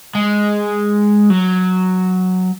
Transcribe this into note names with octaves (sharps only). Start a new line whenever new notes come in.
G#3
F#3